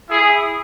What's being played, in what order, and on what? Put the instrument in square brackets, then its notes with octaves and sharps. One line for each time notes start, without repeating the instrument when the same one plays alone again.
[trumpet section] E4 G#4